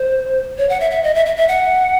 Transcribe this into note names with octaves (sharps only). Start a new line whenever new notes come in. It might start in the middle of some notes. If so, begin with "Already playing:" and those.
Already playing: C5
C#5
F#5
E5
E5
D#5
E5
E5
E5
F#5